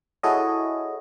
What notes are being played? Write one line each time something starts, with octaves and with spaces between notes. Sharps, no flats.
E4 F#4 G#4 A4 C#5 D#5